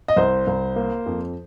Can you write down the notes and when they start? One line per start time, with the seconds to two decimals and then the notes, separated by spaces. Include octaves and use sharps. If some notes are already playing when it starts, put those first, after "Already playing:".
0.08 D#5
0.16 C2 C5
0.47 C2
0.76 A#3
1.06 F2